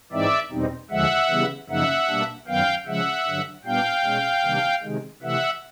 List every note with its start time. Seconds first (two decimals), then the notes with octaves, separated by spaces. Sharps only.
0.12 G#2 E3 G#3 C4 D#4 D5 E5
0.51 E2 B2 G3 C4 D#4
0.91 D#2 D3 F3 G#3 E5 F#5
1.30 C#3 E3 G3 B3
1.69 F#2 C#3 F3 A#3 D#4 E5 F#5
2.08 B2 G3 A#3 D4
2.47 F#2 D#3 F#3 B3 F5 G5
2.86 C#3 F3 G#3 C#4 E5 F#5
3.26 G2 D3 F#3
3.65 A#2 G3 B3 D4 F5 G5
4.04 B2 G#3 C#4
4.44 C3 D#3 G3 A#3 D4
4.83 C3 D#3 G#3
5.22 C3 E3 A3 E5 F#5